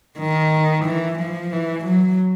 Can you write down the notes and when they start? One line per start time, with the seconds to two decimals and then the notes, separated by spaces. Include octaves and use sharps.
0.18 D#3
0.85 E3
1.19 F3
1.52 E3
1.85 F#3